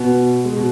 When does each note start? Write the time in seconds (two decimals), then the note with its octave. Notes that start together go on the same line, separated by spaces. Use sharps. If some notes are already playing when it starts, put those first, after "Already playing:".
Already playing: B2 B3
0.45 G#3
0.57 B2